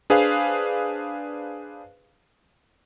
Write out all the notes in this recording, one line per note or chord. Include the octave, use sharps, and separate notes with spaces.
D4 G#4 B4 C5 F5